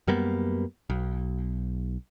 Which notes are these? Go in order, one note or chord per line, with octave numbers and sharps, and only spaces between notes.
F#2 G3 A#3 B3
B1